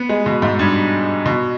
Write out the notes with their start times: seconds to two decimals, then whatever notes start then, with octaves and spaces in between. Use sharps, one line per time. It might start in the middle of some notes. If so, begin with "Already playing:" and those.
Already playing: B3
0.09 G#3
0.26 B2
0.42 G#2
0.59 G2
1.26 B2